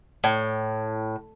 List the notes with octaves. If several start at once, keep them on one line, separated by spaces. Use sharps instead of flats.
A2